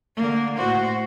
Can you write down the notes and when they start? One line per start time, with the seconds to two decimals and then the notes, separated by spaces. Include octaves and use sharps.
0.16 D3 A#3
0.56 A2 F#4 C5